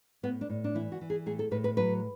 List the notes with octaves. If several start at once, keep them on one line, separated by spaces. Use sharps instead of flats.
A2 B3
D4
A2
D4
E3 E4
F#4
E3
G#4
A2 G#4
A4
A2 B4
B4
F#3 B4